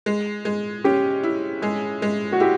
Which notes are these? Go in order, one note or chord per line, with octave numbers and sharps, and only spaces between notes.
G#3
G#3
C#4 G4
E4
G#3 G#4
G#3
F#4
E4 G4